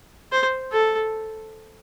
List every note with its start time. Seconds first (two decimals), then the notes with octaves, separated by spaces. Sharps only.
0.32 C5
0.73 A4